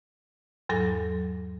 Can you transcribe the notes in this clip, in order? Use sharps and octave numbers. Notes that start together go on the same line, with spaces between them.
E2 G#2 F#3 A4 A#6